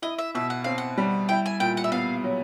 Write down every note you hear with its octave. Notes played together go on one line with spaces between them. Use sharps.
E4 D#5
E5
B2 E5
F#5
C4 F5
F#5
G3
E4 G5
G#5
A#2 G5
F#5
E5
B3 F5
F#3